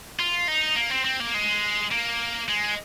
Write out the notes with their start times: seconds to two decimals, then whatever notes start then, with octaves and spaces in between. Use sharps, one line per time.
0.20 F4
0.48 D#4
0.76 A#3
0.91 C4
1.05 C4
1.20 A#3
1.34 G#3
1.91 A#3
2.49 G#3